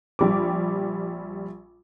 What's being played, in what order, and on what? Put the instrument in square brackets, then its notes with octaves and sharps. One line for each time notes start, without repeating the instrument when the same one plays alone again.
[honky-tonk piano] A#1 G3 D6